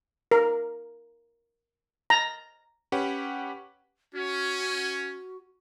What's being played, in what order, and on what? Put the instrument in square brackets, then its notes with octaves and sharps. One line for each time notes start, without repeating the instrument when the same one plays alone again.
[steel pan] A#4
A#5
[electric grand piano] C#4 G4 B4 F#5
[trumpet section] C#4 [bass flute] F#4